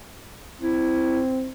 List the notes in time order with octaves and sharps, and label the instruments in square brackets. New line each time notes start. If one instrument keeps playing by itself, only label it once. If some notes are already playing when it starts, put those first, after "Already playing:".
[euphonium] C4 [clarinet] E4